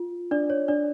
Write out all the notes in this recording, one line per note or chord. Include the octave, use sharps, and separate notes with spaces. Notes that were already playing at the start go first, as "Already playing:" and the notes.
Already playing: F4
D4 D5
C#5
D4 D5